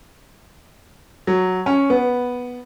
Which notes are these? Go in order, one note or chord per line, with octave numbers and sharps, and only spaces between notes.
F#3
C#4
B3